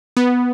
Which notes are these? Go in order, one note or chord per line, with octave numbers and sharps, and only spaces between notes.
B3